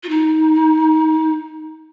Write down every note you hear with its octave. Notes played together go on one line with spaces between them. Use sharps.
F4
D#4